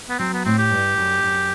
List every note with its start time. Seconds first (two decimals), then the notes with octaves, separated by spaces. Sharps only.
0.09 B3
0.19 F#3 C4
0.33 B3
0.45 A2 C4
0.58 G4
0.71 G2
0.97 F#2
1.24 F#2